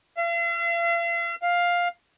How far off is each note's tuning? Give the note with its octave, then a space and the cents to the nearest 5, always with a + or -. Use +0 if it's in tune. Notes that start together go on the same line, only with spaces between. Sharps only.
F5 -45
F5 +5